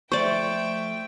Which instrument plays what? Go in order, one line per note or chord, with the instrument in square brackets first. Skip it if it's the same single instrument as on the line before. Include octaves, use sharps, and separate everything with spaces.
[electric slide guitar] F3 A3 [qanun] C5 D5 [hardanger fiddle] E5 G5 [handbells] C#6